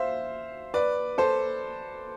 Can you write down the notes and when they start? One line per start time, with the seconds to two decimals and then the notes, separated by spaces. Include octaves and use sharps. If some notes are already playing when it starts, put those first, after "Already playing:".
Already playing: C5 E5 F5
0.74 B4 D5
1.18 A4 C5